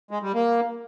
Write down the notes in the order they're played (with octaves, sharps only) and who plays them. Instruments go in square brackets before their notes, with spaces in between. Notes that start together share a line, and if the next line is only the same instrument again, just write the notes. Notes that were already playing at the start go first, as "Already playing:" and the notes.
[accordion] G#3
G3
A#3